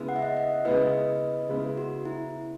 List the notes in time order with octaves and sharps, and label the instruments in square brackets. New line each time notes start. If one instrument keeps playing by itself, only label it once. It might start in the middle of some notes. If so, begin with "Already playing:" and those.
Already playing: [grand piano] C#3 G#3 B3 E4
[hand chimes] F#5
E5
D#5 F#5
D#5 F#5
[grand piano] C#3 G#3 B3 E4 [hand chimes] B4 D#5
[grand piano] C#3 G#3 B3 E4
[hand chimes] F#4
E4